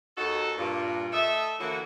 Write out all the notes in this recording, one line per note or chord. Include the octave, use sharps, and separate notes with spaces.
D#2 D#4 F#4 A4
G2 A#2
A3 A4 D#5 E5
D2 D3 E3 F#3 A#3 F#4